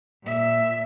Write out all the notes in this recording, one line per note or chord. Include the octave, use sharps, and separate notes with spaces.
A#2 E5